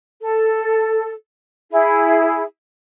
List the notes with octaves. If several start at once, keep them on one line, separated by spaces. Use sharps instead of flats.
A4
E4 G#4